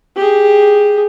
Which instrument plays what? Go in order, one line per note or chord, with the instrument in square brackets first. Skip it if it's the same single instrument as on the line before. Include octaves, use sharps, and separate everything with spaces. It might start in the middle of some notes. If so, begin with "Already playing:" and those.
[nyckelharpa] G4 G#4